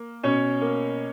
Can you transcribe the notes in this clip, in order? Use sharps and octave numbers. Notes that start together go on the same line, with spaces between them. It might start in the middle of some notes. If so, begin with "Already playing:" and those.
Already playing: A#3
B2 C#4 C#5
A#3